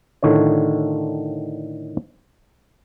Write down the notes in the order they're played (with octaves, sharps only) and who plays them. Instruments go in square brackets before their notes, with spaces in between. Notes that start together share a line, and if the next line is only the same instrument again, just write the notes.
[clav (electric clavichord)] A2 D3 D#3 F4 C#5